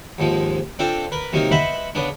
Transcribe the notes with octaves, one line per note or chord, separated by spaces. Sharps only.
D#2 G#2 F3 G#3
C4 D4 F4 A4 C5
A#4 B4
C3 F#3 A#3 D#4 A#4
B4 C5 D#5 E5 F#5 B5
C#3 B3 D4